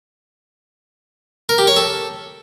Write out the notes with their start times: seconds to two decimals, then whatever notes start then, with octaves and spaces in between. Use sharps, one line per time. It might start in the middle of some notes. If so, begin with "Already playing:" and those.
1.49 A#4
1.58 G4
1.67 C#5
1.76 A4